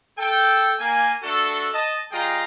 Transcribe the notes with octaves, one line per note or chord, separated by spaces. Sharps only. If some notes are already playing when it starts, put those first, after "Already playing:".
A4 G5
A#3 G#5
A3 D4 F#4 A4
D#5 A5
G3 F4 G#4 D#5 G5 A#5